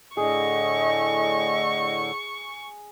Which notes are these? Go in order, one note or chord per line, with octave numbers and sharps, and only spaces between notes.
A2 D3 G#4 D#5 C#6